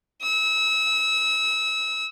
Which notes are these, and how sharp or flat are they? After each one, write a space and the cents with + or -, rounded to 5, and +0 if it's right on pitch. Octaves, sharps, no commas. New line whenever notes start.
E6 -30